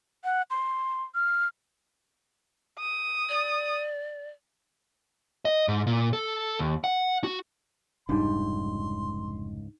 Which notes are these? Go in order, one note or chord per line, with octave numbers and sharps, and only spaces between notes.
F#5
C6
F6
D#6
D5
D#5
G#2
A#2
A4
D#2
F#5
F#4
F1 C#2 G#2 G3 D4 D#4 C6